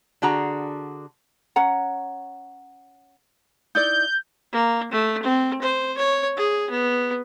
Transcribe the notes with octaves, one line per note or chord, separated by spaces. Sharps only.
D3 D4 F#4 G#4 A#5
C#4 F#5 A#5
D#4 E4 D5 G6
A#3
A3
C4
C5
C#5
G#4
B3